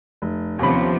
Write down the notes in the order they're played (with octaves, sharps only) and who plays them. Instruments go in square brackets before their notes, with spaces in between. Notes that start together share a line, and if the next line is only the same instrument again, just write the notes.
[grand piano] F1
[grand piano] D#2 C#4 B5 [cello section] C3 F3 B3